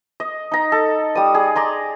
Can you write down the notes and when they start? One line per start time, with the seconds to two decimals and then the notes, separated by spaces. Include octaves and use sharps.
0.20 D#5
0.52 D#4 A#5
0.72 A4
1.15 G3 D#6
1.35 G#4
1.56 D5 A#5 C6